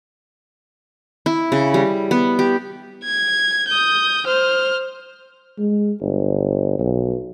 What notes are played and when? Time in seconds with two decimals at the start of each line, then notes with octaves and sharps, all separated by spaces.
1.26 E4
1.52 C#3
1.74 G3
2.11 B3
2.39 G4
3.04 G#6
3.68 D#6 G6
4.27 C5 F6
5.58 G#3
6.01 G1
6.79 B1